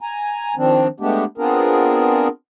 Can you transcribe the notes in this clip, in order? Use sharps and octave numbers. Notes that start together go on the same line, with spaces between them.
G#5 A#5
D#3 F3 C4 D4
G#3 A3 B3 D4 G4
B3 C4 D4 F4 G#4 A#4